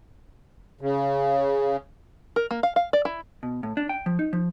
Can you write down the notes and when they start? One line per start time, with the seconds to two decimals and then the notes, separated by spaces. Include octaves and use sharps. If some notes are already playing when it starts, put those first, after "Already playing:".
0.81 C#3
2.36 A#4
2.51 A#3
2.63 F5
2.76 F5
2.93 D5
3.05 E4
3.43 B2
3.63 A2
3.77 D4
3.89 G5
4.06 F3
4.19 D#4
4.33 F3